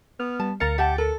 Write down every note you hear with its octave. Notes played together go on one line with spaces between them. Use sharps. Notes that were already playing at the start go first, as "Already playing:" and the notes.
B3 F6
G3 A5
D2 A#4 F5 A#5 A6 C#7
G4 E5 F#5 A5
A4 A#4